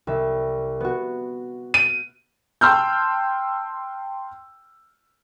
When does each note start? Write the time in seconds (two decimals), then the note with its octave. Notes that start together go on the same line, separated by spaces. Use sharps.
0.07 C2 E5
0.80 B3 F#4
1.74 D#7
2.61 G5 A5 C6 E6 F6 G6